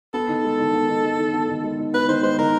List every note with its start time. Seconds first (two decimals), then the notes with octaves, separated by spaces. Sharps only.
0.14 B3 A4
0.29 D#3
0.44 G#3
0.59 D#3
0.74 B3
0.89 D#3
1.04 G#3
1.19 D#3
1.33 B3
1.49 D#3
1.64 G#3
1.78 D#3
1.94 B3 B4
2.08 D#3 C5
2.23 G#3 C5
2.38 D#3 A#4